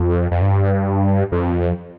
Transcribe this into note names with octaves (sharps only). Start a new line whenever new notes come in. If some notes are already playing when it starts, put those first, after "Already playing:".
Already playing: F2
F2
G2
F2